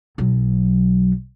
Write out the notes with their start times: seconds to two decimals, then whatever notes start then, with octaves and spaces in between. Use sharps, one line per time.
0.18 B1 F#3